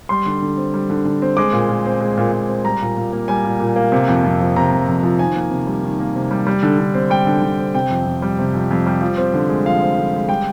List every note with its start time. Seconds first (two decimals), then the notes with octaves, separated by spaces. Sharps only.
0.09 G3 C6
0.26 D3
0.42 D3
0.57 C4
0.74 G3
0.90 D3
1.05 D3
1.22 C4
1.37 G#3 D6
1.53 A#2
1.69 A#2
1.86 C4
2.00 G#3
2.18 A#2
2.32 A#2
2.48 C4
2.64 G3 A#5
2.81 A#2
2.97 A#2
3.13 A#3
3.28 G3 G#5
3.45 A#2
3.60 A#2
3.76 A#3
3.92 C3
4.08 F2
4.24 F2
4.40 F3
4.56 C3 A#5
4.72 F2
4.88 F2
5.03 F3
5.19 D#3 G#5
5.36 A#3
5.51 C3
5.67 G3
5.84 D#3
5.99 A#3
6.15 C3
6.31 G3
6.47 G3
6.63 D3
6.78 D3
6.94 C4
7.10 G3 G5
7.27 D3
7.42 D3
7.59 C4
7.74 C3 G5
7.90 F2
8.06 F2
8.22 G3
8.39 C3
8.54 F2
8.71 F2
8.86 G3
9.01 F3
9.18 C4
9.34 D3
9.49 G#3
9.66 F3 F5
9.82 C4
9.97 D3
10.14 G#3
10.29 G3 G5